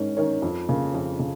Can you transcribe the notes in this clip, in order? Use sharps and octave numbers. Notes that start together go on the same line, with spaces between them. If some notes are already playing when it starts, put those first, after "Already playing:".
Already playing: G#2 D#3 C#4 A#4
D#3 C#4 A#4 C#5
F2
C#3 A#3
F2
C#3